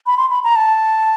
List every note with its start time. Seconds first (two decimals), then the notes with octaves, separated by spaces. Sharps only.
0.07 B5
0.17 C6
0.30 B5
0.44 A#5
0.56 A5